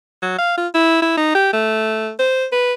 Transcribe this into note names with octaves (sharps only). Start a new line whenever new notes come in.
F#3
F5
F4
E4
E4
D#4
G4
A3
C5
B4